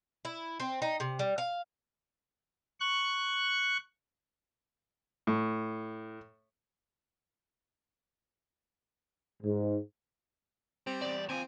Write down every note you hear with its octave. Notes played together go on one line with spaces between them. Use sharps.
E4
C4
D#4
C3
G3
F5
C#6 F#6
A2
G#2
G3 C4
E2 G3 D5
D#2 C4 F4 G#5